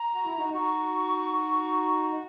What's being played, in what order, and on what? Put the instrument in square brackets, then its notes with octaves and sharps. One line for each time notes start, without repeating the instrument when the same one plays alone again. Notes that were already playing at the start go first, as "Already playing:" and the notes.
Already playing: [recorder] A#5
[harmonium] F#4
E4
D#4 F#4
[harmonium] D#4 F#4 [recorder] C#6